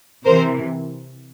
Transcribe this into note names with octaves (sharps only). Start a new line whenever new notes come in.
C3 E3 A#4 C5